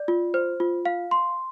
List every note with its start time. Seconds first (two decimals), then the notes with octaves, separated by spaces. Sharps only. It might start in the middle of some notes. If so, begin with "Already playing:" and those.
Already playing: D5
0.08 F4
0.34 C5
0.60 F4
0.85 F5
1.11 C6